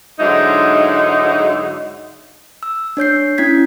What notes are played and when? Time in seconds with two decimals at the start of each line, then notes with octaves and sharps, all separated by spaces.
0.20 G#2 D3 F#3 G#3 D#4 E4
2.63 E6
2.97 D4 C#5 G6 C7
3.38 C#4 E4 G#6 B6